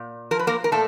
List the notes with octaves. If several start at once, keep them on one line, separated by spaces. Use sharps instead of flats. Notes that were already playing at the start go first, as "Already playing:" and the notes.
Already playing: A#2
F3 A#4
B4
A#3 A#4
A#4
A#2 A3 A4